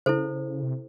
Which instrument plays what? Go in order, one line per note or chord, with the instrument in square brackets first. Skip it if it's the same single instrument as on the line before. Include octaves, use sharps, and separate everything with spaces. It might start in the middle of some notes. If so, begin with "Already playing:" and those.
[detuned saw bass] C#3 [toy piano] E4 A4 C5
[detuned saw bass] C3